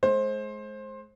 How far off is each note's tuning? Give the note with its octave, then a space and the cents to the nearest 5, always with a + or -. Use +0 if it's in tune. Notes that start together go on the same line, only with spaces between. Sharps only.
G#3 +35 C5 +20